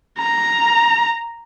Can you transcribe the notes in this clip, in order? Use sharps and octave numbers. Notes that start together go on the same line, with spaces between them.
A#5